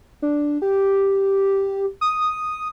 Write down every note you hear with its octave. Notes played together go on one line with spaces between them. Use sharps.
D4
G4
D#6